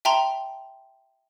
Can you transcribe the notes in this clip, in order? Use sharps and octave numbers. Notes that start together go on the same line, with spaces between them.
E5 G5 A5 A#5 C6